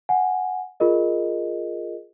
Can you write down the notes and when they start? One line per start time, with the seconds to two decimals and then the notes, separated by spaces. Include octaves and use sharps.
0.09 F#5 G#5
0.80 F4 G#4 A#4 D#5